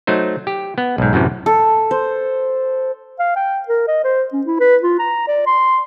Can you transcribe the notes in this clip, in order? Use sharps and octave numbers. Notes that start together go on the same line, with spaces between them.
F#3 A3 D#4 C5
G4
B3
B1 G#2
F#2 A2 C3 E3
A4
C5
F5
G5
A#4
D#5
C5
C#4
E4
B4
F4
A#5
D5
C6